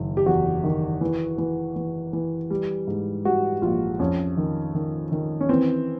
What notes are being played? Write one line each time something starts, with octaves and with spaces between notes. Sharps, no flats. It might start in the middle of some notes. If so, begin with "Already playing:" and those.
Already playing: F#1 D#3
G4
E2 F#4
D#3
E3
E3
E3
E3
G3
G#2
G3 F#4
A#1 F4
F2 C#4
D#3
D#3
D#3
C#4
E3 C4